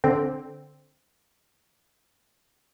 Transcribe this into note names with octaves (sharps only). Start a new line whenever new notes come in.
D3 C4